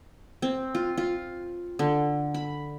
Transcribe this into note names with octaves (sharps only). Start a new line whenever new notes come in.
C4
F4
F4
D3
B5